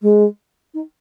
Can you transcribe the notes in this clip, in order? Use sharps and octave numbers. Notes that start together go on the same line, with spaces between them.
G#3
D#4